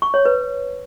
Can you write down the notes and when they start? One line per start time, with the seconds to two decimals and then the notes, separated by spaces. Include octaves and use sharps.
0.02 C#6
0.14 C#5
0.25 B4